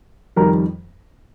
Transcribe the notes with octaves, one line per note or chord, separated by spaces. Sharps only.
F2 D#3 G3 A#4 A#5